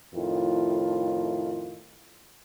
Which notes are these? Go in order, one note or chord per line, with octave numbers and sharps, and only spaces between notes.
F2 A2 D#3 E4 F4